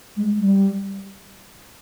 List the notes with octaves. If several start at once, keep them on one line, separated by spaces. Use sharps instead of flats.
G#3
G3